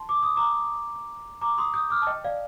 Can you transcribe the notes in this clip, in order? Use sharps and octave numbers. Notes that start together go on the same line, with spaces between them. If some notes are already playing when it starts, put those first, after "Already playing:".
Already playing: A5 C6
D6
D#6
A#5 D6
A#5 D6
C6 D#6
D#6 G6
D6 F6
A5
D#5 G5
D5 F5